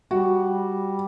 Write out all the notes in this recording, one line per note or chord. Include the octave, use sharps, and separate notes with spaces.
G3 F#4